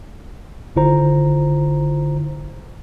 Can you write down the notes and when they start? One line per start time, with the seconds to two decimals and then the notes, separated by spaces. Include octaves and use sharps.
0.76 G#1 D3 E4 F4 C5 A#5